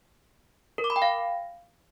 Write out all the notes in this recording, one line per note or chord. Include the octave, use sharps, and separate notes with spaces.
A#4
D6
B5
G5
F5